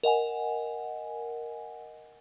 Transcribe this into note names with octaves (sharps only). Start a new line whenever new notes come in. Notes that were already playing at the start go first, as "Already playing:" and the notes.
A#4 D#5 F#5 G#5